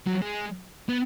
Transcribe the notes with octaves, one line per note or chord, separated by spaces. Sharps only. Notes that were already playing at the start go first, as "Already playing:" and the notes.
F#3
G#3
B3